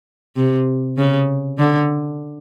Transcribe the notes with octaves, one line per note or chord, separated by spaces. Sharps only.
C3
C#3
D3